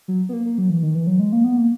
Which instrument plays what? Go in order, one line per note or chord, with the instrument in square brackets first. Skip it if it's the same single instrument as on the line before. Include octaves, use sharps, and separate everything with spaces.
[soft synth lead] F#3
B3
A#3
A#3
F#3
E3
D#3
E3
F#3
G#3
A#3
B3
A#3